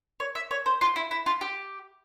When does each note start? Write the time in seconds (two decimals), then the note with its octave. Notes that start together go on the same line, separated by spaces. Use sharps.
0.20 C#5
0.35 E5
0.51 C#5
0.66 C5
0.81 F4
0.96 E4
1.11 E4
1.26 F4
1.41 G4